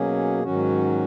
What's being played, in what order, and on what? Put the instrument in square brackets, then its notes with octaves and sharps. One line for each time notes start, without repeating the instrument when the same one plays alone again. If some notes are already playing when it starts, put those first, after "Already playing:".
Already playing: [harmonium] B2 F#3 A#3 C#4 G#4
G#2 D#3 F#3 C#4 F#4